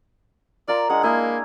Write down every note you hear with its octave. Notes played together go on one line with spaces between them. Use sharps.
F4 A#4 D5
G#3 D4 F#5
A#3 E4 G#4